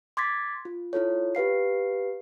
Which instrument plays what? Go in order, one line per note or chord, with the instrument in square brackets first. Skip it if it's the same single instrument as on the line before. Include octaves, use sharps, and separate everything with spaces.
[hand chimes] C6 D6 G#6 A6 B6
F4
E4 F4 A4 C#5
G4 B4 F5 C7